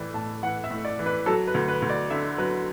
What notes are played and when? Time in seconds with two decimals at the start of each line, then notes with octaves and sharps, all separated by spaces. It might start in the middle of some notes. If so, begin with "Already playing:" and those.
Already playing: A2 E3 D5
0.14 A2 A5
0.43 E3 F#5
0.64 E5
0.70 A2
0.85 D5
0.99 E3
1.06 B4
1.26 F#3 A4
1.47 B4
1.54 D2
1.68 B4
1.82 D2
1.90 D5
2.10 D3 E5
2.38 F#3 B4